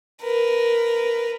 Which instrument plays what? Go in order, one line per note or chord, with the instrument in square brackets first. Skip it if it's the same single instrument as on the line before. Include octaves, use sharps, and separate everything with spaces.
[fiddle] A#4 B4